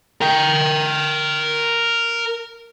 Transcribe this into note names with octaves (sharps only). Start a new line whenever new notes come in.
A#4 G5